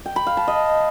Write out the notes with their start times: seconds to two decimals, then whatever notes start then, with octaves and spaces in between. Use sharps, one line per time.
0.06 G5
0.16 B5
0.27 F5
0.37 A5
0.48 D#5